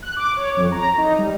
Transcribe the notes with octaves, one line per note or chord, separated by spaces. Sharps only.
F#6
D6
C#5
F2
A#5
D#4
G3